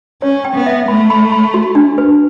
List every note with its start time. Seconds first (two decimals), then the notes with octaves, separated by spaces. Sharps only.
0.22 C#4 C#5
0.45 G5
0.55 B3
0.66 E5
0.88 A3 B5
1.10 B5
1.32 B5
1.54 F#4
1.75 D4
1.98 B4